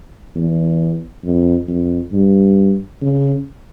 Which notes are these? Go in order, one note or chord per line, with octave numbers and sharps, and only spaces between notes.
E2
F2
F2
G2
C#3